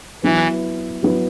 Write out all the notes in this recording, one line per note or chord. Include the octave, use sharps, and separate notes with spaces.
E3 F#3 B3 E4
F#3 B3 E4